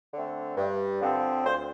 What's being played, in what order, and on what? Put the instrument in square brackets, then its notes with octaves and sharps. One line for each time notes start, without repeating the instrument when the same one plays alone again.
[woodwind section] D3 A3 C4
G2
D3 F3 C4
D2 C5